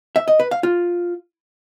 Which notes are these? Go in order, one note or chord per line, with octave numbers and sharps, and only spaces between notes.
E5
D#5
B4
F5
F4